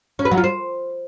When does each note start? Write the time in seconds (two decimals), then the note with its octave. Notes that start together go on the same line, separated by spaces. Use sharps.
0.19 C#4
0.25 B4
0.31 F#3
0.38 F4
0.44 C5